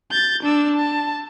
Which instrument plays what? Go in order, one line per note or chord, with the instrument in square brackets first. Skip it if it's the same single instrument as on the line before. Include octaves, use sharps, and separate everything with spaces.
[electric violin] G6 A6
D4 E6
A5